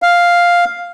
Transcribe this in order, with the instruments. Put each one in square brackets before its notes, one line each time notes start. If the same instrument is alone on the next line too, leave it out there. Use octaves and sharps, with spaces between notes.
[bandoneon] F5